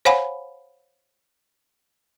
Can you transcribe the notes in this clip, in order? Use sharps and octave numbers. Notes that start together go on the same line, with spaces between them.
C5 C#5 F5 F#5 G#5 B5